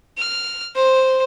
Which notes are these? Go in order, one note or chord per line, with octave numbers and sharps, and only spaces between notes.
F6
C5